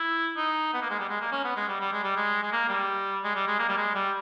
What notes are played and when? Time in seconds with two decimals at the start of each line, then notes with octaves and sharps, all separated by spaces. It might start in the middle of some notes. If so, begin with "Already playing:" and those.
Already playing: E4
0.37 D#4
0.74 B3
0.82 A#3
0.90 G#3
1.00 G3
1.09 G#3
1.21 A#3
1.32 C#4
1.44 B3
1.56 G#3
1.68 G3
1.80 G3
1.92 G#3
2.04 G3
2.16 G#3
2.43 G#3
2.52 A#3
2.69 G3
3.24 G#3
3.35 G3
3.47 G#3
3.59 A#3
3.69 G3
3.77 G#3
3.95 G3